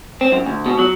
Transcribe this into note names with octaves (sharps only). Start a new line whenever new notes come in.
C4
F#2
D2
B2
F#3